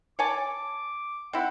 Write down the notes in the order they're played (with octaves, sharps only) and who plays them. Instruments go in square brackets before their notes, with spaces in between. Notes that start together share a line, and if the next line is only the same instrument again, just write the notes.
[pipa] C#5 G#5 A5 [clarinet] D6
[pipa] C4 E4 [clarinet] F#5